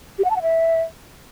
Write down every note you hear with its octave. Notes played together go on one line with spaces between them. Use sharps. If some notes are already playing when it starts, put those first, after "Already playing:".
G4
F#5
A5
F#5
E5